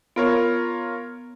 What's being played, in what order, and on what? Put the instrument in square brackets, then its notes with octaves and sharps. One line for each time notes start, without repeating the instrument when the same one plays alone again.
[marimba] B3 [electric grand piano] F4 A#4 C#5